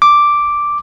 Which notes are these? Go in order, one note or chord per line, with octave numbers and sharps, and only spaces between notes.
D6